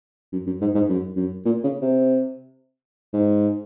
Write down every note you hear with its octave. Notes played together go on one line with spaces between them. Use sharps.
F#2
F#2
G#2
G#2
F#2
F#2
A#2
C#3
C3
G#2